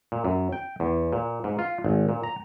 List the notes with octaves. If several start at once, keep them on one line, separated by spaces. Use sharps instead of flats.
A#2
F#2
G5
E2
A#2
G#2
F4
G#1
A#2
A#5